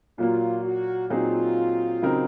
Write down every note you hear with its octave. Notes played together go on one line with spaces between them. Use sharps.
A#2 F#3 A#3 F4
F#4
A#2 F#3 C4 D#4 F4 G#4
C#3 F#3 C4 D#4 A#4